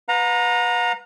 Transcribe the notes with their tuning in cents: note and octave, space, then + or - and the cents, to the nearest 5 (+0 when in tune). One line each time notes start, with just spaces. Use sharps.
B4 +0 F#5 -45 A#5 +0